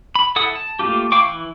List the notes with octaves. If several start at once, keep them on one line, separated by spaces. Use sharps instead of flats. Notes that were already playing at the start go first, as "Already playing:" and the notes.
B5
E4 A4 F#5 D#6
A5
A3 A#3 C4 F4 G4
E4 F5 G5 C#6 D6
E3